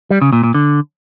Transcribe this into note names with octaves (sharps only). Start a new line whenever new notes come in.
G3
C#3
A#2
A#2
D3